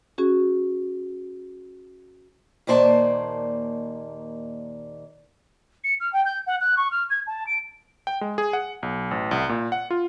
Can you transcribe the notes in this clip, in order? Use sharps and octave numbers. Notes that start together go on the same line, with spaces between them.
C#4 F#4 G#4
D#2 A#2 A#3 C5 D5 A5
C#7
F6
G5
G6
F#5
F#6
C#6
F6
G#6
A5
D7
G5
G#3
G#4
F#5
B1
A1
C2
A#2
F#5
F4